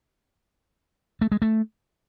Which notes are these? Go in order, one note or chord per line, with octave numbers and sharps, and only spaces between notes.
A3
G#3
A3